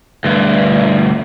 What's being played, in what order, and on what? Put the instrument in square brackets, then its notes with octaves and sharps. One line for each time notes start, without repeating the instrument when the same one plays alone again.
[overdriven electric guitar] D2 G2